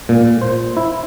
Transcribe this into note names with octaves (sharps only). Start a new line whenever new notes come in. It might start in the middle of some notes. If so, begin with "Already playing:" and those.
A#2
C5
E4